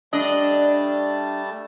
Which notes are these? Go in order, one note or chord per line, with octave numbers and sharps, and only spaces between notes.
G3 A3 D4 D5 D#5 A5